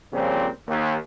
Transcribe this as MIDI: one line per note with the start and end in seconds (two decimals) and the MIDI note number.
0.12 0.46 46
0.12 0.46 49
0.12 0.46 53
0.12 0.46 55
0.12 0.46 60
0.12 0.46 61
0.67 0.95 39